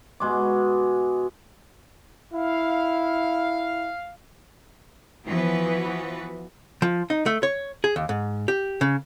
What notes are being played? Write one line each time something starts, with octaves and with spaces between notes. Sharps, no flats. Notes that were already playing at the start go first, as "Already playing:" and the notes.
B2 G#3 D6
E4 F5
E3 F3 B3 F#4 B4
F3
D#4
A3
C#5
G#4
D#2
G#2
G4
C#3